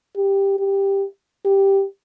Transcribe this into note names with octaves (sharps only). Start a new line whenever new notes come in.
G4
G4
G4